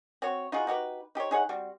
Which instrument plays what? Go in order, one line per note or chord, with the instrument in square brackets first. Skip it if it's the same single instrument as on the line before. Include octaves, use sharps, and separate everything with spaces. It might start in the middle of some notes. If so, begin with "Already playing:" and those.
[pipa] C4 F#4 C#5
D#4 F4 F#4 G#4
D#4 F#4 G4 B4
D#4 G4 C5 C#5
D#4 G#4 C#5 F#5
G3 C4 F#4